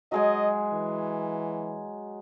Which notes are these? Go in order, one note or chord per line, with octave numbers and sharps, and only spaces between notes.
F#3 G#3 D#5 G#5
E3